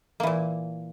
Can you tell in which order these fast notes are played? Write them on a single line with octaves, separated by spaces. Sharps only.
A#3 E3 A#2